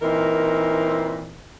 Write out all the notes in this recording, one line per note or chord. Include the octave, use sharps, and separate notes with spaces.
A#2 E3 C4 D#4 A#4